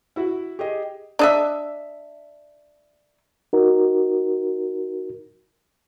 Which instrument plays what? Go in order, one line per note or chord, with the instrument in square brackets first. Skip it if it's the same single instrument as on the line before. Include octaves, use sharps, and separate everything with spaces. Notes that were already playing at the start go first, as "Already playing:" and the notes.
[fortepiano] E4 F#4
[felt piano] G4 G#4 D#5
[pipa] D4 D#5 E5
[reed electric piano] D#4 F#4 A#4